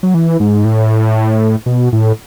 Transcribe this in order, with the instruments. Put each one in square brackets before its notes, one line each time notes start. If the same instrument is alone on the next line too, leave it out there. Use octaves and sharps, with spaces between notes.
[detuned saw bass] F#3
E3
G#2
A2
B2
A2